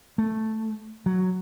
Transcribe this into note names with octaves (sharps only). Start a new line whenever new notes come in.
A3
F#3